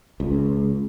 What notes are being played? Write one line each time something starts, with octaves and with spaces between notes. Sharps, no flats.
C#2